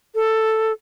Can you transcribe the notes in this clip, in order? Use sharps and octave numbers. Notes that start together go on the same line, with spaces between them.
A4